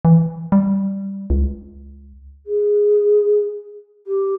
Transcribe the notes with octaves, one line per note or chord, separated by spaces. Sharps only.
E3
G3
C#2
G#4
G4